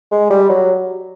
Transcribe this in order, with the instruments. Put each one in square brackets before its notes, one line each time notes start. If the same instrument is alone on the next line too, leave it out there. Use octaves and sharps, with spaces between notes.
[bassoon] G#3
G3
F#3